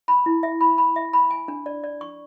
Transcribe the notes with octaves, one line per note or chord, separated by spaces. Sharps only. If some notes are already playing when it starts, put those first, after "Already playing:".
B5
E4
E5
B5
B5
E5
B5
G#5
D4
D5
D5
C#6